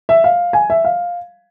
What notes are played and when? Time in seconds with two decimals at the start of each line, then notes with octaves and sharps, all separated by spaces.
0.09 E5
0.24 F5
0.53 G#5
0.70 E5
0.85 F5